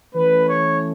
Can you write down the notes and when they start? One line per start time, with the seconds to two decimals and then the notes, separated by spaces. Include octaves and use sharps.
0.13 E3 A3 C#4 B4
0.48 C#5